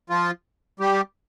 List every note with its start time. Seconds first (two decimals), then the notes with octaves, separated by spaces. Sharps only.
0.10 F3 F4
0.80 G3 G4